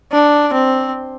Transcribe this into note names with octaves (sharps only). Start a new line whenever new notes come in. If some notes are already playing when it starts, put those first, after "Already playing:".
D4
C4